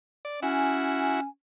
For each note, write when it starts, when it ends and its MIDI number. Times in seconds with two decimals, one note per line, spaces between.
0.25 0.40 74
0.42 1.25 61
0.42 1.20 64
0.42 1.20 66
0.42 1.28 80